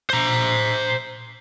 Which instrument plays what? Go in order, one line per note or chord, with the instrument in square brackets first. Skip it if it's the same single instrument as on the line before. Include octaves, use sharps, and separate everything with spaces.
[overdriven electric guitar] C5 A#5